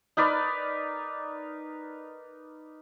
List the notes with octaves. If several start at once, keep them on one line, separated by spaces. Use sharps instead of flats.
D#4 A#4 B4 D5